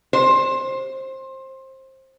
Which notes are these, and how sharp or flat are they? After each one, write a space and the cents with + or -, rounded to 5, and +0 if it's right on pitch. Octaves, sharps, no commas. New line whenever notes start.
C5 +20